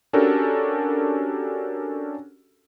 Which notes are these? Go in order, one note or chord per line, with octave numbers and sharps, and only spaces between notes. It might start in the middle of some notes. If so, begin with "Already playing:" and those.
C#4 D4 F#4 G4 A4 A#4